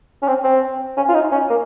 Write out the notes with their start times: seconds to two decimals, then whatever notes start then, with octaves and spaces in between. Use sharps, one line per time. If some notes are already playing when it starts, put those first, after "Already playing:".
0.22 C#4
0.28 C4
0.44 C4
0.97 C#4
1.09 F4
1.15 D#4
1.32 C#4
1.50 A#3